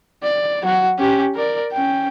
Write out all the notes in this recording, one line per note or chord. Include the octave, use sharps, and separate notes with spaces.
D5
F#3 F#4
C#4 G4
A#4 D5
C#4 G5